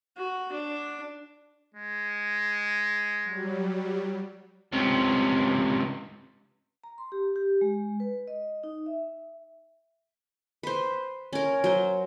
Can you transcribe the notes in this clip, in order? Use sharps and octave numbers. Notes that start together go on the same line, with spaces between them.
F#4
D4
G#3
F#3 G3
C#2 C3
A#5
C6
G4
G4
G#3
B4
D#5
D#4
E5
B4 C5
C#4 A#4
F#3 C5